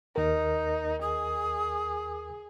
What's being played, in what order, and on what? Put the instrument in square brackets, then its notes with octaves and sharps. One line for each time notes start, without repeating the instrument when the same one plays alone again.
[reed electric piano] D#2 A#4 [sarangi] D#4
[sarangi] G#4 [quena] D#6